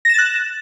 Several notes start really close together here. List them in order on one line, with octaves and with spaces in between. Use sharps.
A#6 E7 A6 F#6